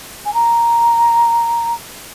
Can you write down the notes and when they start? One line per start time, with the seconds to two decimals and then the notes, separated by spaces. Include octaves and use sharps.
0.25 G#5
0.34 A#5